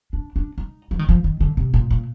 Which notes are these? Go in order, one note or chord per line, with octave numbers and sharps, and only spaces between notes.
D4
D4
D#4
F3
D#3
F3
D#3
D3
C3
A#2
A#2